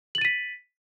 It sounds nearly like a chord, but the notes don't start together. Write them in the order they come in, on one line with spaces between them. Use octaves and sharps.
F#7 A6 D#7 B6